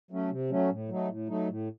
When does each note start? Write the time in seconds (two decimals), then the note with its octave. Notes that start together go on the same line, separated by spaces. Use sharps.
0.11 F#3 A3 C#4
0.30 C3
0.50 F#3 A3 C#4
0.70 A2
0.89 F#3 A3 D#4
1.08 A2
1.29 F#3 A3 D#4
1.49 A2